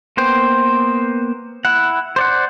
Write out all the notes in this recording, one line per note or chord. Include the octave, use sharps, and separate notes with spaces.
A#3 B3 C5 G5
E4 F#5
C5 D5 F#5